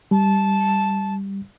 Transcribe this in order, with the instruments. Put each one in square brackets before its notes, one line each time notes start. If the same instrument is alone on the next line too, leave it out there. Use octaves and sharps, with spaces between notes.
[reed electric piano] G3 [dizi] A5